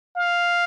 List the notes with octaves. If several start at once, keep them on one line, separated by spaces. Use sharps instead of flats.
F5